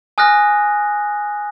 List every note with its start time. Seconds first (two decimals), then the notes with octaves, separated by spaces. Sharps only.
0.18 G#5 D#6 F6 F#6 A#6